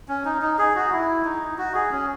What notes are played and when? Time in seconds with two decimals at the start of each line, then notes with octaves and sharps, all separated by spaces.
0.08 C#4
0.25 D#4
0.42 D#4
0.58 G#4
0.76 F#4
0.92 E4
1.25 D#4
1.58 F#4
1.75 G#4
1.92 C#4